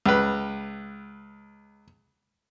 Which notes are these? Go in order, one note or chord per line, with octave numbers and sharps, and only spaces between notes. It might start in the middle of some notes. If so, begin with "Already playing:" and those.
C#2 B4